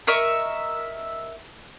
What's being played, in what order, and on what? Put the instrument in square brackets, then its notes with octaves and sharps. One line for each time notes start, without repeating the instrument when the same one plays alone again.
[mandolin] A#4 D#5 E5 C#6